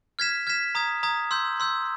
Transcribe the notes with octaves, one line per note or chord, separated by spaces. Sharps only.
F6 G#6 B6 E7
F6 G#6 B6 E7
A#5 D#6 G#6
A#5 D#6 G#6
C6 E6 G6
C6 E6 G6